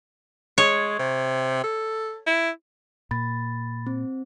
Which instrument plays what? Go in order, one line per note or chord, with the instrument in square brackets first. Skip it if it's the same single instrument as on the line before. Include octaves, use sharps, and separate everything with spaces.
[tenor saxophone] G#3 [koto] C#5
[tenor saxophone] C3
A4
E4
[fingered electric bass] A#2 [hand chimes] B5 A6
[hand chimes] C4